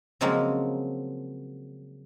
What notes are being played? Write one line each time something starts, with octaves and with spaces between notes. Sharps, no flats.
C#3 F3 F#3 G#3 A#3 C4